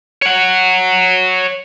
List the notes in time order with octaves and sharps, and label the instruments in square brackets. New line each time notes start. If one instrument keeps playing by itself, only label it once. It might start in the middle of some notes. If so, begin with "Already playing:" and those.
[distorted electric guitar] C#5 F#5